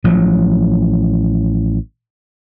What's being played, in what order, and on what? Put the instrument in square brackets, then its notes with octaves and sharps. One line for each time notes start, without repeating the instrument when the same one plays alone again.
[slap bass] A1 F3 F#3